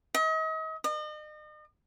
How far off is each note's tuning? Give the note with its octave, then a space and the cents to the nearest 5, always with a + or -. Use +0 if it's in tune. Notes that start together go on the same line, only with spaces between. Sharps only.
D#5 +40
D#5 -40